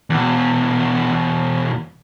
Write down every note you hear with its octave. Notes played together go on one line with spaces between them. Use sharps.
E2 B2